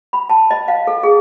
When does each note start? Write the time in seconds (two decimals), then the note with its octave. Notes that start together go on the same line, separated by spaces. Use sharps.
0.13 B5
0.30 A5
0.51 D#5
0.68 F5
0.87 A4
1.03 G#4